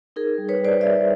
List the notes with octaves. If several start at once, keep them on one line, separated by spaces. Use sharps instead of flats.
D#4 G#4 A#4
G3
B4 C#5
G3
C5 D5
G3 D5 E5